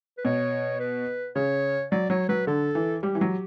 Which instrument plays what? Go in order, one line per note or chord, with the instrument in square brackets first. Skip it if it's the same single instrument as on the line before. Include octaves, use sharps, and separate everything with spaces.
[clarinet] B4
[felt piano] B2 [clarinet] C#5
[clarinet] B4
[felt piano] C#3 [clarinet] C#5
[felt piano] F#3 [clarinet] D5
[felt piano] F#3 [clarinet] C#5
[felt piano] F#3 [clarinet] B4
[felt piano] D3 [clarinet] A4
[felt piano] E3
[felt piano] G3 [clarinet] G4
[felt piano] E3
F#3